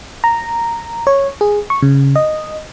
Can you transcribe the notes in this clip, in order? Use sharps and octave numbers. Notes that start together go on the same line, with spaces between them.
A#5
C#5
G#4
C#6
C#3
D#5